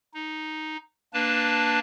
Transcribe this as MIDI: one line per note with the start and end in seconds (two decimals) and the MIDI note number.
0.14 0.77 63
1.14 1.79 58
1.14 1.79 62
1.14 1.79 71
1.14 1.79 81